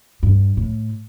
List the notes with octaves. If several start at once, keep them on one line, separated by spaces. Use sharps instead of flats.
G2
A2